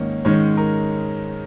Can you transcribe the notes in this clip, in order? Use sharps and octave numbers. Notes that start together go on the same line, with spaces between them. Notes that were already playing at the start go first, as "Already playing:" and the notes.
Already playing: G#2 D#3 A#3 C#4
G#2 D#3 G#3 C#4 C#5
A#4